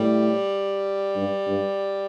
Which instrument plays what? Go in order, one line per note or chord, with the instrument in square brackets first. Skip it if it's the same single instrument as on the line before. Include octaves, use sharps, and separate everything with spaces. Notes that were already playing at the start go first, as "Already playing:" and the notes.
Already playing: [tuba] A2 [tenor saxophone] G3
[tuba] G2
G2